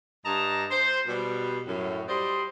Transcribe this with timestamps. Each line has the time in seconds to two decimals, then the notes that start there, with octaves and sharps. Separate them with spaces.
0.24 G2 D#5 A5 A#5
0.70 C5
1.07 B2 G3
1.66 F#2 A2
2.07 G3 C5 D5 D#5 C6